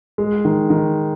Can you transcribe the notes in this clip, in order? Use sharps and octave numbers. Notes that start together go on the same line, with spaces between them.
G#3
D#3
D#3